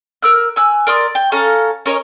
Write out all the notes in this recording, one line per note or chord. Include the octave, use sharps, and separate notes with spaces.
A#4 E6 F#6
G#5 E6 F#6
A#4 D5 C6 D#6
G5
C#4 A4 F5 A#5
C#4 A#4 C#5 D#5